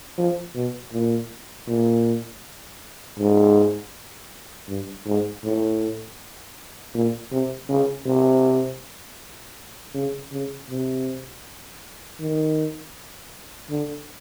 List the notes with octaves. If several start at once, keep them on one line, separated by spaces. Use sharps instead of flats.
F3
B2
A#2
A#2
G#2
G2
G#2
A2
A#2
C3
C#3
C3
C#3
C#3
C3
D#3
D3